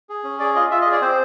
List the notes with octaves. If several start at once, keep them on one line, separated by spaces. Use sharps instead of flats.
G#4
C#4
G#4 D5
F4 D#5
F4 E5
D#5
G#4
D5
C4 C5